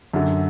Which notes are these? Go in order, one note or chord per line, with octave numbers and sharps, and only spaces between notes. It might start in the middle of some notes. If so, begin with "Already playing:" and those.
F#2 D3